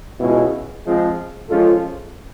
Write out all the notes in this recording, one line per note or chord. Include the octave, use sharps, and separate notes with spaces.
C#2 B2 G#3 C#4 E4
F3 G#3 C4
F3 G#3 C#4 F4 A4